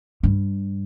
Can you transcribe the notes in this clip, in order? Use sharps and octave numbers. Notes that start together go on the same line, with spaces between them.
G2